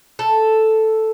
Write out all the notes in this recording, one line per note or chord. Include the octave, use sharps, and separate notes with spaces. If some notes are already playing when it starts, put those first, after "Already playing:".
A4